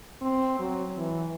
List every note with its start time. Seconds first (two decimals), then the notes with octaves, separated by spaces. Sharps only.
0.21 C4
0.59 F#3
0.97 E3